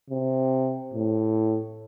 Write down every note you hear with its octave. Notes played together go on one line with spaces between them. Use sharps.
C3
A2